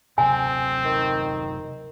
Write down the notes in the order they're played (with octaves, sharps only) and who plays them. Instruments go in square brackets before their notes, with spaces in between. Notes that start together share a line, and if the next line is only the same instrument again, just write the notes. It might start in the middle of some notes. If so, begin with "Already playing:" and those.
[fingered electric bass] F#1 C3 F#3 [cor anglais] C4 [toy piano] G#5
[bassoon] D#3